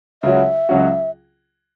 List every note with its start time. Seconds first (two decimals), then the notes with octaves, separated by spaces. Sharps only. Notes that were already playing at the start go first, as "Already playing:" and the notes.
0.23 C#2 C#3 F#3 C#4 F#4 E5
0.69 C#2 C#3 F#3 C#4 F#4